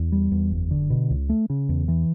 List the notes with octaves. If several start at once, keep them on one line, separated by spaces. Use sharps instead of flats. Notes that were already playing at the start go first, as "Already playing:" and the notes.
Already playing: E2
G3
E2
F#1
D3
B2
C#2
A3
C#3
E2
E3